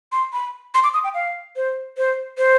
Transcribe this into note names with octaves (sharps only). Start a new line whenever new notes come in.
C6
B5
C6
D6
D#6
G5
F5
C5
C5
C5